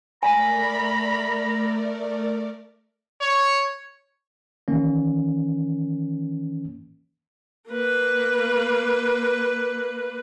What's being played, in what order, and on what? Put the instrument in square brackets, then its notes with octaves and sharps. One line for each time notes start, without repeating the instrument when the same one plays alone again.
[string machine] A3 A#4 D5 [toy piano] G#5 [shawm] A#5 [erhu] B5
[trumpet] C#5
[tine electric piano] D#3 E3 A#3 C#4
[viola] A#3 B4